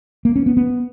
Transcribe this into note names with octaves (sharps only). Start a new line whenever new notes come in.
A#3
C#4
B3
B3